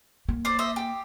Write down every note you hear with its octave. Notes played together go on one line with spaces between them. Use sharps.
A#3
C5 D5
C5 D#5 E5
G4